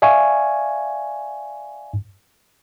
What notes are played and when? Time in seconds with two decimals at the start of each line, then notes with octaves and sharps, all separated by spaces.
0.02 D5 E5 F5 G#5 C#6